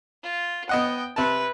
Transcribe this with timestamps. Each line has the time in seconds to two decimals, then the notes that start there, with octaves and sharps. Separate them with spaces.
0.23 F4
0.69 B3 D#5 F#5 G5
1.16 C3 B4 A5